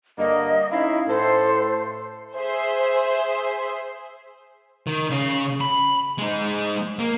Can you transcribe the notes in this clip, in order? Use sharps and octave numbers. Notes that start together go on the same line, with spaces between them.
G2 D3 A#3 D#5
C#4 D#4 E4 F5
A2 A4 C5
G#4 C5 E5
D#3
C#3
B5
G#3 D#4
A#3